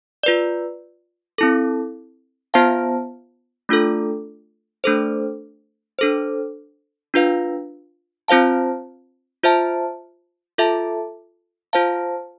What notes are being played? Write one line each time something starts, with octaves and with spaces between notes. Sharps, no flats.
F4 B4 D5
C4 E4 A4
B3 F4 C5 F5 A5
A3 D4 F4 A4
A3 D4 A4 C5
D4 A4 C5
D4 F4 B4 F5
C4 F4 C5 F5 A5
F4 C5 E5 A5
F4 A4 E5 A5
F4 C5 F5 A5